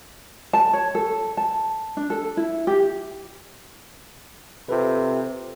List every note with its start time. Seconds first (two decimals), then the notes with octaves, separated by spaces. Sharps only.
0.53 A5
0.73 C#5
0.95 A4
1.37 A5
1.97 D4
2.10 A4
2.37 E4
2.67 G4
4.69 C3 F4 A4 B4